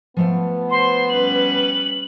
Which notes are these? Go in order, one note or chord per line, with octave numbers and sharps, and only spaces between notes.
F3 A3 B3 F5
C5 C6
G3 C#4 B4 F#7